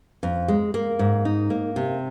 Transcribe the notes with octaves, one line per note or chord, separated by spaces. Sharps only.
F2
G#3
A#3
G#2
D#4
A#3
C3